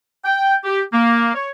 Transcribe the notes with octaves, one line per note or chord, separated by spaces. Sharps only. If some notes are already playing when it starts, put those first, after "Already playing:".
G5
G4
A#3
C#5